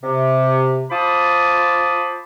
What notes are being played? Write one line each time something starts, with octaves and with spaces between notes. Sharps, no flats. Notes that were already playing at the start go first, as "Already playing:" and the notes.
C3
F4 C5 A5 B5 D6 D#6